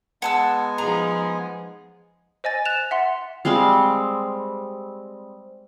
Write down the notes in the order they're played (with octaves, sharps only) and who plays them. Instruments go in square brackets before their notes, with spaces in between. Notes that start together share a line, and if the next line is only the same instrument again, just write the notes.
[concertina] G#3 B3 G#5 [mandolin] F#5 A5 E6
[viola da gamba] F3 D#4 G#4 [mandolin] A#5
[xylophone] C5 D#5 G#5 A6
F#6 A6 E7 F7
E5 F#5 C6
[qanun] G3 G#3 C4 F5